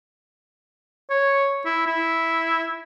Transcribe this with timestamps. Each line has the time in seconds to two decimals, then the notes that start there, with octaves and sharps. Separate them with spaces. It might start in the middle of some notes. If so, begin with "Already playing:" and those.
1.10 C#5
1.66 E4
1.86 E4